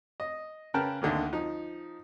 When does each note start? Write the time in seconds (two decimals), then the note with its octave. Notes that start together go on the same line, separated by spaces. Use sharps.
0.20 D#5
0.74 C#3 A#4 B4 G5 A5 F6
1.02 D2 D3 D#3 A#3
1.33 F3 D#4